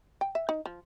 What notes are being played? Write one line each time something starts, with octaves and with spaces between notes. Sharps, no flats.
G5
E5
D#4
F3